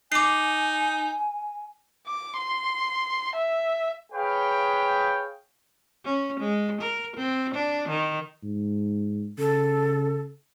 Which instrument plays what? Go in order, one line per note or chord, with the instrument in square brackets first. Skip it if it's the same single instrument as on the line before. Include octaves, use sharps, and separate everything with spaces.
[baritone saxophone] D#4 [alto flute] G#5 [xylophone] D6 C7
[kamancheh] D6
C6
E5
[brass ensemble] G#4 B4 C#5 F5 G5
[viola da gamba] C#4
G#3
A#4
C4
D4
D#3
[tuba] G#2
[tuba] C#3 [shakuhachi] A4